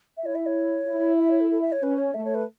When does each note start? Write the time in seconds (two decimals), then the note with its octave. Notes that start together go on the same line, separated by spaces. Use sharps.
0.17 E5
0.25 E4 C#5
0.35 E5
0.46 C#5
0.87 E4
1.19 E5
1.31 C#5
1.40 A4
1.51 A4
1.61 E5
1.72 C#5
1.83 C#4 B4
1.98 C#5
2.14 A3 E5
2.25 C#5
2.34 B4